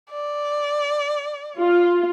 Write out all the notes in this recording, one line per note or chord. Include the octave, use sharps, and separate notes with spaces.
D5
F4